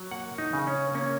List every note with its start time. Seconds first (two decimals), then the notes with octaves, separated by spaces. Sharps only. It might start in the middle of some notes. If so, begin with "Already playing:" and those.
Already playing: F#3
0.11 A#3 F#5
0.38 D#4
0.53 C#3
0.67 C#4
0.94 A#3 C#4